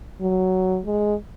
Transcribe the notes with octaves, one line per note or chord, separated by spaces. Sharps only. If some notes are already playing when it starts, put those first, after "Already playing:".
F#3
G#3